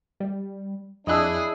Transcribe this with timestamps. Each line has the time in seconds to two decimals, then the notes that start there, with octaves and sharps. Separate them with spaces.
0.20 G3
1.07 F2 D4 E4 G#4 D#5 E6 F#6